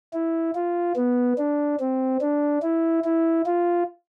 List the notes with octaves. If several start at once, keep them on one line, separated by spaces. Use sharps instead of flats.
E4
F4
B3
D4
C4
D4
E4
E4
F4